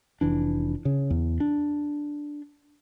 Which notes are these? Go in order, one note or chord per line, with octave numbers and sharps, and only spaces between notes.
F1 E3 D4
C#3
E2
D4